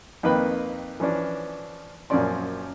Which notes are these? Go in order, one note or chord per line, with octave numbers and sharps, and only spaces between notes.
F2 D#3 A#3 B4 G5 B5
E3 F3 C#4 D4
F#2 A#2 F3 C#4 D5 C6